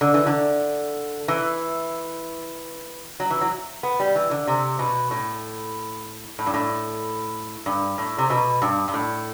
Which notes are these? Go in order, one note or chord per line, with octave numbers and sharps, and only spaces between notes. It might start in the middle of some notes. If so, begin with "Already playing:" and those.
D3
E3
D3
E3
F#3
E3
F#3
B3
G3
E3
D3
C3
B2
A2
A2
G2
A2
G2
A2
C3
B2
G2
G2
A2